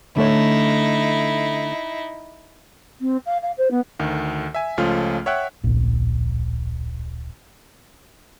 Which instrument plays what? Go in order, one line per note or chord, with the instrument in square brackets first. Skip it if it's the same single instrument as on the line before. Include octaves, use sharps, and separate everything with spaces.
[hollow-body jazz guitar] D3 A3 C#5 [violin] D#4 E4
[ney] C4
F5
F5
C5
B3
[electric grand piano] D2 D#3
E5 G#5
C#2 F3 A3 C#4 F4 F6
C#5 E5 F#5 G5 F#6
[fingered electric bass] D1 A#1